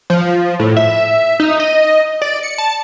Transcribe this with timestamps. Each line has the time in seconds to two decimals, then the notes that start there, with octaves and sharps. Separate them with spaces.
0.10 F3
0.59 A2
0.77 E5
1.40 D#4
1.60 D#5
2.22 D5
2.43 C#7
2.58 A5